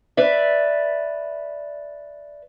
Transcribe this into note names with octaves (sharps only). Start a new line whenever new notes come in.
B4 D5 E5